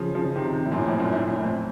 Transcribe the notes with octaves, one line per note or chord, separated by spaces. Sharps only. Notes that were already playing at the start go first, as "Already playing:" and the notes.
Already playing: C#3 F3
C#3 F3
C3 D#3
A2
F#2 A#2
F2 A2
F#2 A#2
A2
F#2 A#2
F2 A2